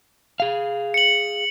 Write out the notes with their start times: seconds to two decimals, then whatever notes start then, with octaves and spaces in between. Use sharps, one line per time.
0.40 G#4 F5
0.94 C#7 F#7